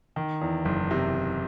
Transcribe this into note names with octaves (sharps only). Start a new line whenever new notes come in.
D#3
E2
F#1
C3